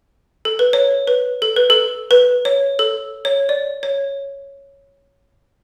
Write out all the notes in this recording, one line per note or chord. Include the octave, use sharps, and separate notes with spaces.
A4
B4
C#5
B4
A4
B4
A4
B4
C#5
A4
C#5
D5
C#5